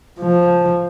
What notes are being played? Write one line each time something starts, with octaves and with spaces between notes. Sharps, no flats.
F3